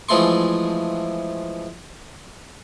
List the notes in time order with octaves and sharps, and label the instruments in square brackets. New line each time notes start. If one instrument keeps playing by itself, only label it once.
[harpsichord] E3 F3 G#3 A3 C6 C#6